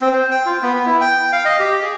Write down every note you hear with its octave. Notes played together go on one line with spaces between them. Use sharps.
C4
C5
G5
F4
B3
B3
E4
G5
F5
D#5
G4
G#4